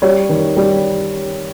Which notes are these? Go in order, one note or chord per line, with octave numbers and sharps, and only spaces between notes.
G3 C#5
D#3
G3